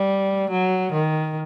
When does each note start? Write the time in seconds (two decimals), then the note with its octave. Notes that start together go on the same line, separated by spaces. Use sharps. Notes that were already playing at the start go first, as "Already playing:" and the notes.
Already playing: G3
0.50 F#3
0.92 D#3